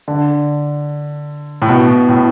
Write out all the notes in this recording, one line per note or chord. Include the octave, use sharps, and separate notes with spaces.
D3
A2
B2
A2